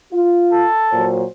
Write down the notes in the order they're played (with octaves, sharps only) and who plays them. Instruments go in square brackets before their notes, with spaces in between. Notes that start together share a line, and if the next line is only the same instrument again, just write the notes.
[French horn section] F4
[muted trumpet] A4
[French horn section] A#2 F#3 C5